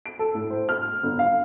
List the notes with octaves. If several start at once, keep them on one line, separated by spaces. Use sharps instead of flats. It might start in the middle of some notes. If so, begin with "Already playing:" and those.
D7
A4
A2
C5
F6
G1
F5